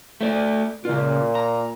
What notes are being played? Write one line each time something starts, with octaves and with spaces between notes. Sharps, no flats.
A3 C#5 D5
A#2 C#3 F4
A#5